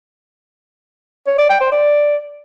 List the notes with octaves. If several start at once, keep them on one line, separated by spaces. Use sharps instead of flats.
C#5
D5
G5
C5
D5